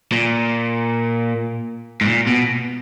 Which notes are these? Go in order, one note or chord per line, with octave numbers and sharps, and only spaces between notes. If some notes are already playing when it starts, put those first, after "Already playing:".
A#2
G#2
A#2
B2